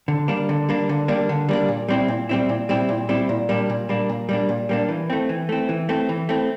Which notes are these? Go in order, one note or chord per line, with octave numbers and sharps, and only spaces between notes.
D3
G3 A#3 D4
D3
G3 A#3 D4
D3
G3 A#3 D4
D3
G3 A#3 D4
A#2
G3 C4 E4
A#2
G3 C4 E4
A#2
G3 C4 E4
A#2
G3 C4 E4
A#2
G3 A#3 D4
A#2
G3 A#3 D4
A#2
G3 A#3 D4
A#2
G3 A#3 D4
E3
A3 C4
E3
A3 C4
E3
A3 C4
E3
A3 C4